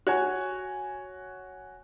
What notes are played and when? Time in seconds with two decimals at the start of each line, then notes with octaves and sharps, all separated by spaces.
0.07 F#4 C#5 G#5